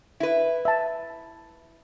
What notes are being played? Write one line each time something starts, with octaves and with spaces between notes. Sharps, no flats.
E4 B4
E5 A5